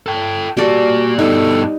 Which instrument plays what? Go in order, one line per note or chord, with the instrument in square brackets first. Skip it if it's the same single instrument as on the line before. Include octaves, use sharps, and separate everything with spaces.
[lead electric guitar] A4 G5
[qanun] G3 A4 [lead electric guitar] A#3 D5 [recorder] F#4
[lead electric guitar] G2 B2 [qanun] D#4 [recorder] A4